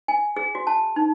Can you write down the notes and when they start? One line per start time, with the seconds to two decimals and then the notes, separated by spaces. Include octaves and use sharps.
0.08 G#5
0.37 G#4
0.55 F#4
0.67 A5
0.96 D#4